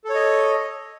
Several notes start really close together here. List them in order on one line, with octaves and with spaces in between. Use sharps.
A4 C#5 D#5